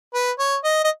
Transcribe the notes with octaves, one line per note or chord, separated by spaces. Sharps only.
B4
C#5
D#5
D#5